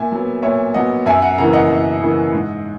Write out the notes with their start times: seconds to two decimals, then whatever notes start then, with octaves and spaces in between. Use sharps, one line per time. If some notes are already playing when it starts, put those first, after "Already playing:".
Already playing: A#2 E5 G#5
0.12 F#3 B3
0.42 A#2 C#5 E5
0.74 F#3 B3 D#5 F#5
1.06 F#2 E5 G#5
1.22 F#5 A#5
1.38 C#3 E3 A#3 F#5 A#5
1.53 D#5 F#5
1.70 F#2
2.01 C#3 E3 A#3
2.33 G#2